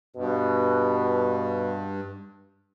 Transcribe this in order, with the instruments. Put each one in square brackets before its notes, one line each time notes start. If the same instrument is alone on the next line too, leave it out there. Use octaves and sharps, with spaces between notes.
[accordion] G2 [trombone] B2